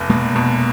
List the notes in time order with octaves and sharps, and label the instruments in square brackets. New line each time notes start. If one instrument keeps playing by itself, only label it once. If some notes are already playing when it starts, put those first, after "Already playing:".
Already playing: [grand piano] F1 E2
[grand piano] B2 [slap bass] G#3 A#3
[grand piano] B2